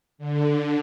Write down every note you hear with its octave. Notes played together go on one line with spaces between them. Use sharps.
D3